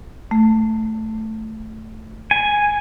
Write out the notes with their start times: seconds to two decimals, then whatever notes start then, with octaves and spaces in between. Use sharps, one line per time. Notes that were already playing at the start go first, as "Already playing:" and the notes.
0.31 A3
2.31 G#5